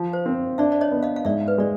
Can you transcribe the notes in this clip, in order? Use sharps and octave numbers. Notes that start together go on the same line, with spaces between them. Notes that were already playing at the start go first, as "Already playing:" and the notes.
Already playing: F3
C5
C4
D4 D5 E5
D5
C#5 D#5
B3
D#5 F5
F5
G#2 D5 E5
B4
G#3 D5